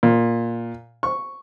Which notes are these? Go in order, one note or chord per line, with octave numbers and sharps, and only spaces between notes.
A#2
C#6